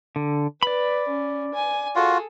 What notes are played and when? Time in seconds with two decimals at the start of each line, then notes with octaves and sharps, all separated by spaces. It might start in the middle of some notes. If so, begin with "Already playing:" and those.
0.16 D3
0.63 B4 D5 B5
1.08 C#4
1.55 G#5
1.96 F4 F#4 G#4 A4